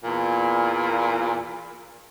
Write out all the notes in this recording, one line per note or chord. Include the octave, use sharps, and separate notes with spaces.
E2 A#2